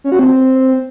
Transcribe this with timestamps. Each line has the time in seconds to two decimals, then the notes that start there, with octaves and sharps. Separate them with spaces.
0.04 C#4
0.12 F#4
0.19 C4